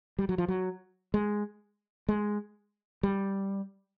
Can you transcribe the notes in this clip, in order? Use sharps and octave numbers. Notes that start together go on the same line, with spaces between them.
G3
F#3
F3
F#3
G#3
G#3
G3